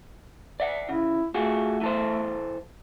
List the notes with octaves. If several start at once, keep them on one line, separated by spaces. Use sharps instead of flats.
D5 E5 F#5
C#3 E4
A3 F4 F#4 G#4
E3 A4 C5